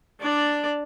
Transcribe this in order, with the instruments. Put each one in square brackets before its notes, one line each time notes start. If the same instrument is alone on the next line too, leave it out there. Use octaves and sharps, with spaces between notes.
[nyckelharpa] D4 D5